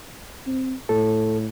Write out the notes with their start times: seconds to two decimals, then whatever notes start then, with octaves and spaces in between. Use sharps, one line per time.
0.47 C4
0.89 A2 A4